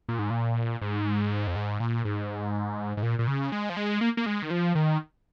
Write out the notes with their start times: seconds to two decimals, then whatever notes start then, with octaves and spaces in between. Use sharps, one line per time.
0.09 A#2
0.19 G#2
0.30 A#2
0.82 G#2
1.47 F2
1.56 G#2
1.80 A#2
2.05 G#2
2.97 G#2
3.03 A#2
3.19 A#2
3.28 C#3
3.52 G#3
3.69 F3
3.77 G#3
4.01 A#3
4.17 A#3
4.26 G#3
4.42 D#3
4.51 F3
4.75 D#3